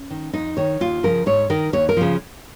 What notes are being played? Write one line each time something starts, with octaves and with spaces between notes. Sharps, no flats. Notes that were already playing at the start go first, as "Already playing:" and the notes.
Already playing: C#4
D#3
F2 D#4
D#3 C#5
D#2 F4
C#3 F3 A#4
G#2 C#5
D#3 A#4
D#2 C#5
A#4
C#3 F3